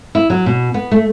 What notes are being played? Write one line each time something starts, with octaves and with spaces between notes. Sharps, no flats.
E4
F#3
B2
B3
A3